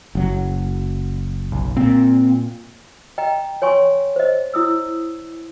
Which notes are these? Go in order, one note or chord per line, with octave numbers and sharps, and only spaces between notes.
F#1 F#3
B1
A#2 C4
D#5 G5 A#5
C#5 G#5 C6 C#6
C5 D#5
E4 D#6 E6